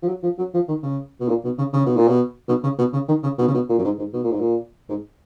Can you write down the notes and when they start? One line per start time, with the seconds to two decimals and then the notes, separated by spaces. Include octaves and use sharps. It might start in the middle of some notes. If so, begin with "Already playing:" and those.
0.02 F3
0.08 F#3
0.23 F3
0.39 F#3
0.54 F3
0.68 D#3
0.83 C#3
1.20 B2
1.29 A#2
1.44 B2
1.58 C#3
1.73 C#3
1.86 B2
1.97 A#2
2.08 B2
2.49 B2
2.64 C#3
2.79 B2
2.93 C#3
3.09 D#3
3.23 C#3
3.39 B2
3.48 C#3
3.54 B2
3.69 A#2
3.79 F#2
3.84 G#2
3.98 G#2
4.13 B2
4.24 A#2
4.32 G#2
4.41 A#2
4.89 G#2